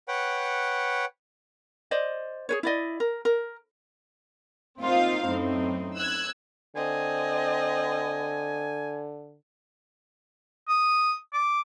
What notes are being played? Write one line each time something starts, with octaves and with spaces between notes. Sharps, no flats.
B4 C#5 F#5 G5
C5 D5 D#5
G#4 B4 C#5
E4 D5 D#5
A#4
A#4
A#3 C4 D#4 F4 C5 F5
F#2 A2 C4 D#4
E6 F#6 G#6
D3 C4 D#5 G#5
D#6
D6